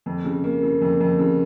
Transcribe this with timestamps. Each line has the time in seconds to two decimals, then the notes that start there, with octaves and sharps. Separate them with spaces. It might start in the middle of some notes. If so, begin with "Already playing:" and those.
0.06 F2
0.25 C#3
0.44 A#3
0.63 C#3
0.81 F2
1.00 F2
1.19 C#3